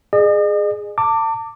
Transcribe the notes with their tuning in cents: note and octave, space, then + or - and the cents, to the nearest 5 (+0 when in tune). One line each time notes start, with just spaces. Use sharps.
G#4 +0 D#5 -45
A5 +35 D6 +0